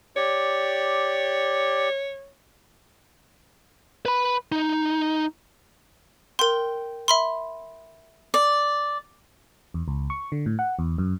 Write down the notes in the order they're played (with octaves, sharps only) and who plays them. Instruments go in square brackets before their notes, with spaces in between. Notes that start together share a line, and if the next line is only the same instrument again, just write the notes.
[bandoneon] G4 D5 [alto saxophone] C#5
[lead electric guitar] B4 B5
D#4
[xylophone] A#4 C6 [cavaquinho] G5
[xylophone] E5 B5 C6
[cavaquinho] D5
[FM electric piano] E2
C#2
C#6
D3
A2
F#5
E2
F#2